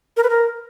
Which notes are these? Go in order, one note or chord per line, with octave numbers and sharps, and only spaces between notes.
A#4
B4
A#4